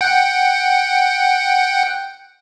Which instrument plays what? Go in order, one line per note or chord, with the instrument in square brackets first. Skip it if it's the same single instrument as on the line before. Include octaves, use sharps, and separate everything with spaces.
[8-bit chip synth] F#5 G5